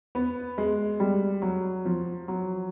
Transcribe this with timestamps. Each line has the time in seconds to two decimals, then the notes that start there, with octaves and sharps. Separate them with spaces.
0.15 B3
0.58 G#3
1.00 G3
1.42 F#3
1.85 F3
2.28 F#3